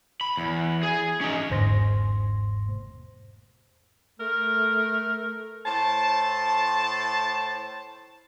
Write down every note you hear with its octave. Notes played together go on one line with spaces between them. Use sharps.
B5
E2
G#4
C#4 D#4
G1 E2 G#2 C5 C6 A#6
A3 A#4
A2 C5 A5